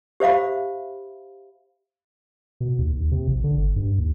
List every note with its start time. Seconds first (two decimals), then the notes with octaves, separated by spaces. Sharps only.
0.20 G4 C5 E5 F5 B5
2.60 B2
2.78 D#2
2.93 D#2
3.11 C3
3.28 A#1
3.44 D3
3.57 G1
3.76 G2
3.98 D#2